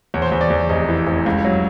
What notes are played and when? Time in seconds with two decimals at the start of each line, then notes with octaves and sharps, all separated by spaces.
0.14 E2 C#5
0.22 C5
0.29 E2 C#5
0.41 D5
0.50 E2
0.69 F1 D#5
0.88 E3
1.07 F1
1.26 C#2
1.45 F#3